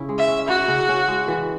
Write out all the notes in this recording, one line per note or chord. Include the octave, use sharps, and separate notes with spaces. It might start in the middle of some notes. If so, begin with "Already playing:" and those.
Already playing: C#3 C#4 E4
G#3
E5
C#4
E4 F#4
C#3
C#4
G#3
E3